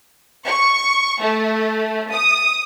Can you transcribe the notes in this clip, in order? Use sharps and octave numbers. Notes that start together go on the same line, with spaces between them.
C#6
A3
D#6